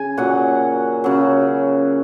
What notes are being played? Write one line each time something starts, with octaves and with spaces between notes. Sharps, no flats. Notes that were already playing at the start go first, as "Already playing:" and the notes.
Already playing: C#3 G#5
A#2 F#3 F#5
C#3 F#3